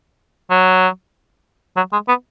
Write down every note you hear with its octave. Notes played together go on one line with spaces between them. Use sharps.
F#3
F#3
G#3
B3